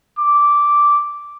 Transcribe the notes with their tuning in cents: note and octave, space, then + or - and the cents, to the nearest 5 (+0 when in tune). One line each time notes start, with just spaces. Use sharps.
D6 -5